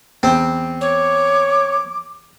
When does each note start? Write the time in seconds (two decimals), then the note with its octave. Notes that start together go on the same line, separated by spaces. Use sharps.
0.23 E2 C4 G5
0.81 C#5 D6